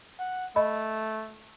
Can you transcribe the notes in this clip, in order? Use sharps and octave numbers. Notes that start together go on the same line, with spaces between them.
F#5
A3 D#5 B5